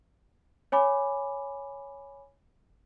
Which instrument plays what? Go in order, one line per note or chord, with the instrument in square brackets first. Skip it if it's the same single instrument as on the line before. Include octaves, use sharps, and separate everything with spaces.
[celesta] C#5 G#5 B5 D6